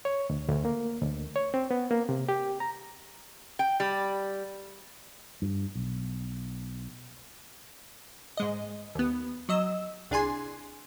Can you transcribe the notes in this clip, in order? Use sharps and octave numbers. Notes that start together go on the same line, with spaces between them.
C#5
D2
D2
A#3
D2
C#5
C4
B3
A#3
C3
G4
A#5
G5
G3
G2
B1
G#2 G#3 D#5
D#2 B3
F#3 D#5 E6
C2 D4 G#4 G#5 C6